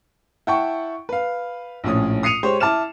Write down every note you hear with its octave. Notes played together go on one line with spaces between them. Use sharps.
E4 F#5 G5 A5 C#6
B4 F5
A#1 A2 C#4 D#6
D#6 C7 C#7 D#7 F7
G#3 G4 C5 C#5
E4 A5 D6 F6 E7